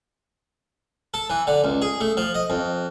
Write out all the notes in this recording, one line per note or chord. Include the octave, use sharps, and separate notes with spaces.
A4
E3
D3
C#2
G#4
A3
F3
D#5
F2